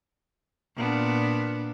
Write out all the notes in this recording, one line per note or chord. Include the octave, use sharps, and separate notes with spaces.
A#2 B3 D4